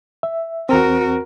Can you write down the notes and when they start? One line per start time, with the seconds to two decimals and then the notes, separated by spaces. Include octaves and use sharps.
0.23 E5
0.69 E2 C4 F#4 A#4